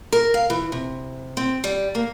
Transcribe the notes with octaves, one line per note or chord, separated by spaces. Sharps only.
A#4
F5
E3
C3
C4
G3
A#3